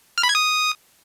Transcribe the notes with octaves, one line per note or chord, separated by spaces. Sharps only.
F6
B5
G#6
D#6